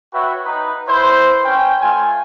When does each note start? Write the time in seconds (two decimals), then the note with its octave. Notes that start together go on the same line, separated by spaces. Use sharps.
0.14 F#4 B4 C#5 E5 G5
0.45 D#4 B4
0.88 E4 B4 C5
1.45 C#4 G5
1.81 A3 F4 G#5